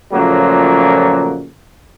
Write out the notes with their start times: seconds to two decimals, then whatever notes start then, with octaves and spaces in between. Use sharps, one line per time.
0.13 A#2 C#3 F3 F#3 A3 A#3